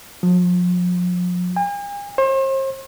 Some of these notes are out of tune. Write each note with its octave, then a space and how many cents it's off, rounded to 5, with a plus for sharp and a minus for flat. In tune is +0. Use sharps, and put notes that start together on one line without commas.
F3 +40
G#5 -45
C5 +40